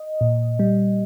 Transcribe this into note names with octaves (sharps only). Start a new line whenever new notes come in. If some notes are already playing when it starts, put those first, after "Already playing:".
Already playing: D#5
A#2
G3